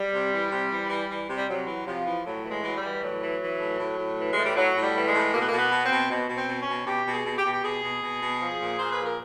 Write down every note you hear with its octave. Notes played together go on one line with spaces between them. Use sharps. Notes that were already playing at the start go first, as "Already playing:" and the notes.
Already playing: G3
C3
E3
C3
E3
E3
E3
C3
G3
C3 F#3
E3
C3 F3
E3
A2 F#3
E3
G#3
E3 F#3
G3
E3
A2 F#3
E3
E3
A2
A2
A2
E3
A2 G#3
G3
A2 F#3
A2
G3
E3
G#3
A2
B2 A#3
B3
B2 A#3
B3
B2
C4
B2
B2
B2
C4
B2
C#4
B2
B2 G4
B2
G#4
B2
G4
B2
G4
B2 G#4
B2
B2
B2
F3
A#2
A#2 C5
B4
F3
A#4